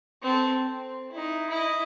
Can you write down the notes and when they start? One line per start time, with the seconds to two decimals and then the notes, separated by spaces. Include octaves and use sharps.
0.22 C4 A4
0.64 C4
1.12 D#4 E4
1.50 E4 D#5